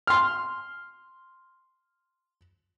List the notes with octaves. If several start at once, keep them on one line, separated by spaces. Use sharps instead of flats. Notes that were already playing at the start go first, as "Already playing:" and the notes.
C6 F6